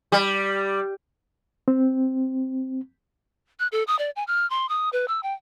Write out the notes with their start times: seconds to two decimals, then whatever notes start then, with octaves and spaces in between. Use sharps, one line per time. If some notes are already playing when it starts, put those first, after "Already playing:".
0.12 G3
1.68 C4
3.60 F#6
3.72 A4
3.87 D#6
3.99 D5
4.16 G#5
4.27 F6
4.50 C6
4.69 D#6
4.93 B4
5.08 E6
5.23 G5